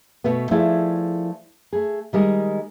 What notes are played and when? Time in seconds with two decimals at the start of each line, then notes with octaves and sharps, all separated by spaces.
0.24 B2 A3 B3
0.51 F3 A3 E4 G#4 D5
1.73 A3 G#4
2.13 D#3 G3 G#3 D#5